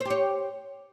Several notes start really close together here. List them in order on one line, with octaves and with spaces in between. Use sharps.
C5 G4 C#5